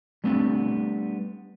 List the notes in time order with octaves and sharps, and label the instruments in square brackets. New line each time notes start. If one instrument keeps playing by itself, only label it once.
[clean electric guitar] G3 A3 B3 C4 D4